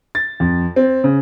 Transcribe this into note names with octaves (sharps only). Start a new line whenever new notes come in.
A6
F2
C4
C#3